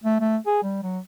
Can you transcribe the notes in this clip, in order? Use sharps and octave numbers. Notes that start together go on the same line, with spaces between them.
A3
A3
G#4
G3
F#3